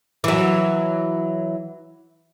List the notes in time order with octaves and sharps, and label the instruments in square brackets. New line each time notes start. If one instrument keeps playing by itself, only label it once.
[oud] E3 F#3